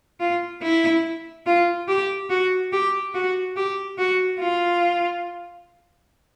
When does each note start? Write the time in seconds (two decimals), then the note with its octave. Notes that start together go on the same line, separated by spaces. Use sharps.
0.20 F4
0.62 E4
1.46 F4
1.88 G4
2.30 F#4
2.72 G4
3.14 F#4
3.56 G4
3.98 F#4
4.40 F4